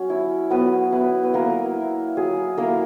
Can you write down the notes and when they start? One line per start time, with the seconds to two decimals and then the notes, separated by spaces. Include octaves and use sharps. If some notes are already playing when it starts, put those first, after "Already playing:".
Already playing: F#3 C#4
0.10 E4
0.50 F#3 B3 B4
0.92 B3 E4 B4
1.23 B4
1.34 F#3 A#3 A#4
1.75 E4
2.17 F#3 G#4
2.57 A#3 E4 A#4